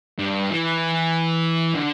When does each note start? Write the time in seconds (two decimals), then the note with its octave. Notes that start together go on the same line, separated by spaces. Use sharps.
0.19 G2
0.50 E3
1.75 D3